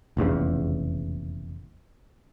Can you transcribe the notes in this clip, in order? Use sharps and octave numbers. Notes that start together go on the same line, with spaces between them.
F1 A#1 E2 C#3